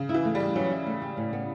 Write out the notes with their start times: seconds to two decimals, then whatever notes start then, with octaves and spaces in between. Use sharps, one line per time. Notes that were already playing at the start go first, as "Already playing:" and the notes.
Already playing: C#3
0.09 E4
0.14 E3
0.25 A3
0.35 G3
0.40 G4
0.55 E3 F#3
0.71 E4
0.86 A3
1.02 G4
1.17 A2
1.33 B3